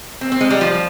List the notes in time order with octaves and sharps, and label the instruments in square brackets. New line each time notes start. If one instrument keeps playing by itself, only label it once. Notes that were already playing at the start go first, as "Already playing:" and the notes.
[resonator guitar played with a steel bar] C4
C4
G#3
G3
F3